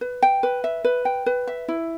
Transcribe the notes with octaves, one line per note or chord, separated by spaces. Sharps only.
B4
G5
B4
E5
B4
G5
B4
E5
E4